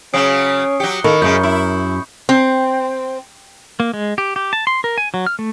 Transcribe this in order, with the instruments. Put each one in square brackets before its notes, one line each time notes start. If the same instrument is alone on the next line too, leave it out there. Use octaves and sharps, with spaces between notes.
[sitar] C#3 F#3 [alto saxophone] C#4 [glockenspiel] D#6 C7 D7
[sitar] F#3 G4 [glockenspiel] C#7 G7
[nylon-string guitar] D#3 [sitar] A#3 [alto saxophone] A4 [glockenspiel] B5 C#6 C#7
[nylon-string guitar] F#2 [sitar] C#3 G#3 [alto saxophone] A#4 [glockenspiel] G6
[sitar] E4
[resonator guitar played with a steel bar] C4
[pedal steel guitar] A#3
G#3
G4
G4
A5
C6
A#4
G#5
F#3
F6
A3